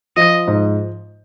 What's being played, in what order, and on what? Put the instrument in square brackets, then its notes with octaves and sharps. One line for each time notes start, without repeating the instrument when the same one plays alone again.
[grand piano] F3 [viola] D#5
[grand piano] G#2